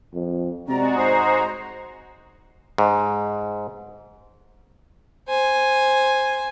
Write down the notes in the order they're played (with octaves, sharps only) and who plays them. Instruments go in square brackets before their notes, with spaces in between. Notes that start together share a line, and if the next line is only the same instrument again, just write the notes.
[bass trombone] F2
[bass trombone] C3 [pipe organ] G#3 F#4 [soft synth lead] C4 [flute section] D5 A#5
[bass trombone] G#2 [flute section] C5 A#5 [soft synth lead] D#6
[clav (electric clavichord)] G#2
[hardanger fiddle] C5 G#5